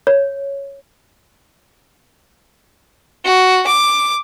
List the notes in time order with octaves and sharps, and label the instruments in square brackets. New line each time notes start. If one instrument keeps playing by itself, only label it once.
[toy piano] C#5
[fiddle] F#4
D6